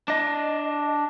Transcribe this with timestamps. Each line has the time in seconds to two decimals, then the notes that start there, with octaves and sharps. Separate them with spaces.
0.08 D4 D#5